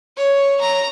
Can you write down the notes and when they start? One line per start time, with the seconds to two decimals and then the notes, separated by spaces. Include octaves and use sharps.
0.17 C#5
0.61 A#5